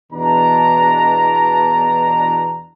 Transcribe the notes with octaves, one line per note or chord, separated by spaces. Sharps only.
E2 B2 D4 A#5